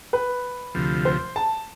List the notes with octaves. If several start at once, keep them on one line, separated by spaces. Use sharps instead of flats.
B4
D2 C3 F3
C5
A5